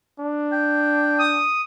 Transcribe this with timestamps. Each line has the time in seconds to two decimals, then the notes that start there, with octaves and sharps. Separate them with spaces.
0.20 D4
0.52 G5
1.19 D#6